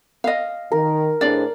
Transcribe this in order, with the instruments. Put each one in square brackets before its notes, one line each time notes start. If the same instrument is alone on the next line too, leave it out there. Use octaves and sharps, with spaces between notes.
[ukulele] D#5 F5
[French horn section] D#3 [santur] A#4
[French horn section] A2 G#4 C5 [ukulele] D4 D5